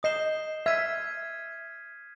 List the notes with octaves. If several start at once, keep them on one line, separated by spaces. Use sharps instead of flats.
D#5 D#6 G6 C7 E7 G7
E5 F6 G#6 B6 D#7